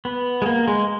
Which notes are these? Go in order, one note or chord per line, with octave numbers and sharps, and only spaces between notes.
B3
G#3
A#3
G#3